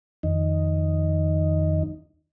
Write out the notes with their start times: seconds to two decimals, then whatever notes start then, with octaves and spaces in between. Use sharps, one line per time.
0.23 F2 D#3 D#4